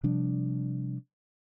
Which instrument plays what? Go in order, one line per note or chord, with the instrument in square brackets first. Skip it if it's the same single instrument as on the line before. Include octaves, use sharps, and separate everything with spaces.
[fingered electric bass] C3 F3 G3 D4